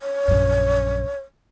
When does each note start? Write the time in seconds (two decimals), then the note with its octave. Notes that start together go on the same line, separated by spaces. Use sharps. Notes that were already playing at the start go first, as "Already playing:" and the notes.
0.01 C#5
0.28 A#1 F#2